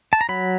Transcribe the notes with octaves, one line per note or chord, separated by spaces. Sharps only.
A5
A#5
F#3 B5